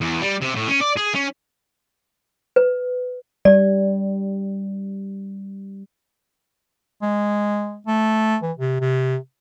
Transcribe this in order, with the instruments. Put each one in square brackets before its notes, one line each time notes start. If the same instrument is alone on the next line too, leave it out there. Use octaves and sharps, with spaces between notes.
[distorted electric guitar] E2
G3
C3
A2
C#4
D5
G#4
C#4
[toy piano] B4
[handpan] G3 [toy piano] D5
[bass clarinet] G#3
A3
E3
C3
C3